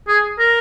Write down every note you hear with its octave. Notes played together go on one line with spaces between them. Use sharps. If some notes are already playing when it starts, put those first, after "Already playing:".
G#4
A#4